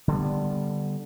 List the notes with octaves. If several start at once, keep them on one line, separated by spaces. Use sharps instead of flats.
D3 G3 B3